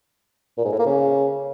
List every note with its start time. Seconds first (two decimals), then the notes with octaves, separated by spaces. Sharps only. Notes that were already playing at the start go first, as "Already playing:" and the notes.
0.58 A#2
0.65 G#2
0.72 A2
0.79 A#3
0.86 C#3